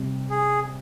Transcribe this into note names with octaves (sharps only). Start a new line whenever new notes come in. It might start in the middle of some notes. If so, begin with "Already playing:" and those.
Already playing: C3 G3
G#4